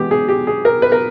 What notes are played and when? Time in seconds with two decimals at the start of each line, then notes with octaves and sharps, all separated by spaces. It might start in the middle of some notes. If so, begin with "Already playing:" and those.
Already playing: E3 G#3 B3 G4
0.11 G#4
0.28 G4
0.47 G#4
0.65 A#4
0.82 B4
0.92 A#4